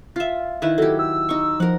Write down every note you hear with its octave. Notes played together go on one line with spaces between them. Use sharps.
F4 E5
D#3 E4 B4
F#3 G4 A4
E6
D#4 C#6
F3 A#4 F#5